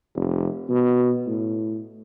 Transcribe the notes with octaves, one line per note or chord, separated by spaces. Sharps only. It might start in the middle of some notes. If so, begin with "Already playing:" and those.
F1
B2
A2